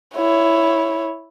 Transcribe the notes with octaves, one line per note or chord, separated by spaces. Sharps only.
E4 C#5